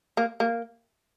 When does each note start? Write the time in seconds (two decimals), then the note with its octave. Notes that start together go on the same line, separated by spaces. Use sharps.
0.17 A#3
0.40 A#3